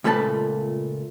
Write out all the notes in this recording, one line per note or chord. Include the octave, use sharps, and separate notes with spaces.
C#2 A#2 A3 B4 A5